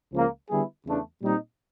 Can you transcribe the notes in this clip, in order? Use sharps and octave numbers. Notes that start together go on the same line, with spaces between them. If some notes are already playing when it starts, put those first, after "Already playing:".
C#2 C#3 F3 A#3
D3 G3 B3 E4 G#4
E2 C#3 E3 A3 D4
A#2 G3 C4 D#4